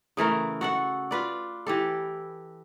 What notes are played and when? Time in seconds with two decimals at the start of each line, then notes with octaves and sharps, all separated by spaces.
0.17 C#3 E3 A3 A#4
0.61 F#4 A4 F#5
1.11 F4 B4 D5
1.67 E3 G4 A4